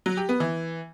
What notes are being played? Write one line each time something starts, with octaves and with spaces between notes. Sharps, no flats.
F#3
G4
B3
E3